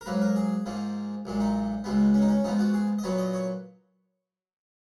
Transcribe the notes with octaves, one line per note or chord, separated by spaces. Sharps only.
A#4
G#2 F#3 A#3 B4
A#4
G#4
G#2 F3 A#3
B1 A#2 G#3
D#4
C#2 B2 G#3 B3
C#4
D#4
C#4
G#2 F3 B3 D#4
F#4
G#4
D#5
A#2 F#3 B3 C#5
D#5
C#5